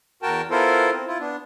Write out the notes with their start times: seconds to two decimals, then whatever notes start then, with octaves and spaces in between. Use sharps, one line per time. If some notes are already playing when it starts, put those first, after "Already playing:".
0.22 E2 F#4 A#4 G5 A5
0.51 B3 E4 F4 A4 A#4 C5
0.92 C4
1.07 E4 F4
1.20 B3 D4